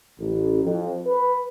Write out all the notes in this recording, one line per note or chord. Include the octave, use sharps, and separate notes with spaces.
A1
F2
B4